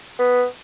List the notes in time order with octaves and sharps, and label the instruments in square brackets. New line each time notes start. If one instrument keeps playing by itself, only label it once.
[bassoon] B3